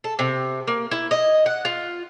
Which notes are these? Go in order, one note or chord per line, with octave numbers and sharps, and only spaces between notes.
A4
C3
A#3
E4
D#5
F#5
F4